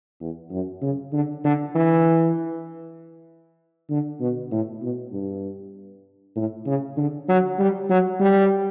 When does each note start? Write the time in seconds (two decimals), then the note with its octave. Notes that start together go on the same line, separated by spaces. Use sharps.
0.21 E2
0.51 F#2
0.82 C#3
1.13 D3
1.44 D3
1.75 E3
3.90 D3
4.21 B2
4.51 A2
4.82 B2
5.12 G2
6.36 A2
6.66 C#3
6.97 D3
7.28 F#3
7.59 G3
7.90 F#3
8.20 G3